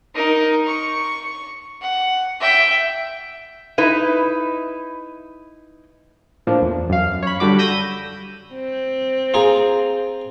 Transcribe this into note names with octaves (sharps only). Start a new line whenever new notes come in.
D#4 A#4
C#6
F#5
E5 G5
D#4 E4 B4
A2 F3 A#3 D4
E2
F#2 F5
C#5 B5
D3 G3 D4 F#4 B5 D6
B5 E6 G6 A#6 D#7
C4
F4 G#4 A#5